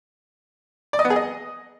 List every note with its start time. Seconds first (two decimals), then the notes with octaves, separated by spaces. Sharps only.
0.93 D5
0.99 D#5
1.05 B3
1.10 G#4
1.16 D#5